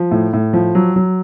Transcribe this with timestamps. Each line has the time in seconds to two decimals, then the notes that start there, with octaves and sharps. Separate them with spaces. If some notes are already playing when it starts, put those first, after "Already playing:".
Already playing: F3
0.11 A2
0.33 A2
0.53 F3
0.75 F#3
0.96 F#3